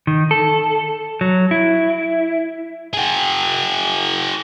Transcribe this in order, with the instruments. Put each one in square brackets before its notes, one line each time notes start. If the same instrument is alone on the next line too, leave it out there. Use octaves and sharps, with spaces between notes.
[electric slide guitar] D#3
A4
F#3
E4
[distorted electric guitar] F#4 G#4